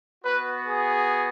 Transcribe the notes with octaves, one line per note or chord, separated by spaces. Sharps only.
B3 F#4 B4
G#4